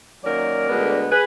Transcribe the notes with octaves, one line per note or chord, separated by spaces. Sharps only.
F#2 D#3 F#3 A#3 A#4 D5
D2 D3 G#3 B3
G#4 B4